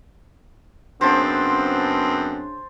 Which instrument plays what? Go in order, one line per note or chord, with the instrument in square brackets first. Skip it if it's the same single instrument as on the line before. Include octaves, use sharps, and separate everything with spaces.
[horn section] F#2 B3 C4 [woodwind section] C#3 D4 [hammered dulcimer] C5 A5